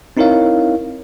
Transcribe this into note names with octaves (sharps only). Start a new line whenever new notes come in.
C4 D#4 E4 A#4 C#5 F5